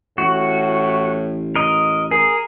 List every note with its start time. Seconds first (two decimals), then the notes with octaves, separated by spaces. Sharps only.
0.18 A1 A2 F#4
1.55 A#4 D#5
2.11 G#4 A#4